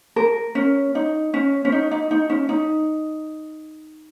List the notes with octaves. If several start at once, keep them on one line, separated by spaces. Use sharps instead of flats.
A#4
C#4
D#4
C#4
C#4
D#4
D#4
D#4
C#4
D#4